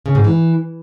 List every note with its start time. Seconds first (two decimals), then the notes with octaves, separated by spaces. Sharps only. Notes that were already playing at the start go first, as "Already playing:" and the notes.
0.06 C#3
0.15 G#2
0.24 E3